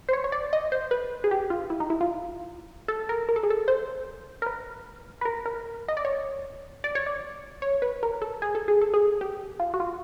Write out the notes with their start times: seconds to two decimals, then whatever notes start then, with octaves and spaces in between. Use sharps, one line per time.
0.09 C5
0.13 C#5
0.24 C#5
0.32 D5
0.53 D#5
0.72 C5
0.91 B4
1.24 G#4
1.31 G4
1.50 F4
1.70 E4
1.80 D#4
1.90 E4
2.01 F4
2.88 A4
3.09 A#4
3.29 A#4
3.36 A4
3.43 G#4
3.50 A4
3.68 C5
4.42 A#4
4.46 B4
5.21 B4
5.25 A#4
5.46 A#4
5.88 D#5
5.97 D5
6.05 C#5
6.84 D5
6.95 C#5
7.06 D5
7.62 C#5
7.82 B4
8.03 A#4
8.22 A4
8.42 G#4
8.55 A4
8.68 G#4
8.81 A4
8.94 G#4
9.21 G4
9.60 F4
9.74 F#4
9.80 F4